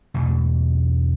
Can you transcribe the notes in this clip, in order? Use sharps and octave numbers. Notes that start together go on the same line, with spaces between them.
B1 E2 B2 A3